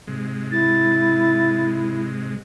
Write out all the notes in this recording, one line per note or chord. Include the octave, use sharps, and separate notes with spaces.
G#2 C3 G#3
E4 A6